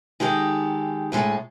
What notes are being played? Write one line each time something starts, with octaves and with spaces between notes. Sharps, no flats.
D#3 G#3 D#4 G4 A4
D2 A2 G#3 A4